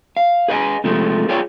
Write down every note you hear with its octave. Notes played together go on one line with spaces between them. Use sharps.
F5
G#4 B4 D#5 F5 G#5
C3 F3 G#3 A3
F4 G#4 C#5 D5 G5